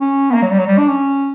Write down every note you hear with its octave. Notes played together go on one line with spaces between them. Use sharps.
C#4
B3
A#3
F#3
G3
F#3
G3
D4
C#4